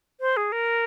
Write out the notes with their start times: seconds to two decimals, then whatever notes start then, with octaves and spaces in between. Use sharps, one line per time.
0.21 C5
0.37 G#4
0.52 A#4